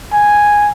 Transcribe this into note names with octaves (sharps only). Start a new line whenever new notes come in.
G#5